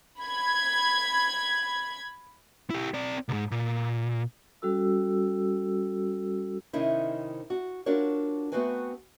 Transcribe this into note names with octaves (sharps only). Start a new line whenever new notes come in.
B5 G#6
E4 G4
C4 D5
C2 G#2
A#2
G3 C#4 F#4 A4 E6
C3 D#3 C4 C#4 D#4 E4
F#4
D4 F4 F#4 A#4 C#5
A3 B3 C4 F#4 B4 G#5